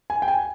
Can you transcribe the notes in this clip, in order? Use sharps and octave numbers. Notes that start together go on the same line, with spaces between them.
G#5
G5
G#5